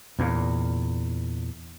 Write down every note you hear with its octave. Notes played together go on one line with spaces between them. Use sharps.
E2 A#2